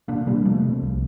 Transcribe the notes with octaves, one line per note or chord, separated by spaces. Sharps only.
C3 A#3 D4
C3 G3 A#3
C3 F3 A3
C3
C2